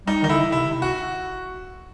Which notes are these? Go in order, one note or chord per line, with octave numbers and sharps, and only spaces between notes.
G3 D#4
D#3 D#4
D3 E4
C3 E4
F#4